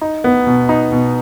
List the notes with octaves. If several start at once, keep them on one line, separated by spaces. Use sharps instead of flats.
D#4
B3
B2
D#4
B2